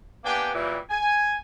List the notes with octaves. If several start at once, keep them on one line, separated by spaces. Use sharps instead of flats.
A#3 B3 D4 G4 G5 G#5
A#2 E3 F#3 G3
G#5